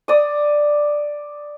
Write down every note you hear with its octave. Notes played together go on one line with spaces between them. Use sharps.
D5 D#6